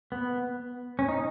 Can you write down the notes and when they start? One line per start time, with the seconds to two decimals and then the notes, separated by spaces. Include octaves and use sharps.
0.12 B3
0.99 C#4
1.09 D#4